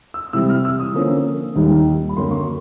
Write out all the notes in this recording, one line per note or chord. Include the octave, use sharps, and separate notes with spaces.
E6
C3 E3 G3 C4 E4 E6
F6
E6
D#6
D3 F3 A#3 C#4
D#2 D#3 G3
B5
F#2 D3 F#3 A#3 C6
C#6